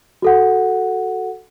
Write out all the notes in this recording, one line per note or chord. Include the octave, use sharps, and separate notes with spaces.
F#4 A4 F#5